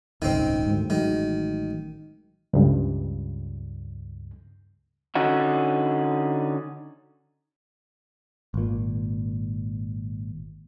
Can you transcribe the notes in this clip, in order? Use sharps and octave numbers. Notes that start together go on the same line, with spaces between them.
D#1 G#1 C#2 D#3 C4
D2 G#2
A1 D#3 F#3 G#3
C#2 G2
D3 C#4 D#4 F#4
G#1 A#2